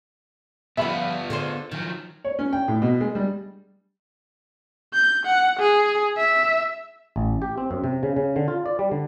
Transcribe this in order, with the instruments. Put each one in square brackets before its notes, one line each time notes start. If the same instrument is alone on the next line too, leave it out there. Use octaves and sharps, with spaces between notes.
[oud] F3 G3 [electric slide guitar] B3 F4 [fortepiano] E5 B5
[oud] D3 G#4 C5
[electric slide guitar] D#3 F3 [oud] F#3
[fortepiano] C#5
C#4
G5
A2
B2
G#3
G3
[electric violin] G6
F#5
G#4
E5
[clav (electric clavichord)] A1
G4
C4
F#2
C3
C#3
C#3
D3
F4
D5
G3
D3